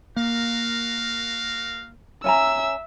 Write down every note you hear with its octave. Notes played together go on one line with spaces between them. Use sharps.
A#3 F#4 A#4 F5
C#4 E5 G#5 A#5 E6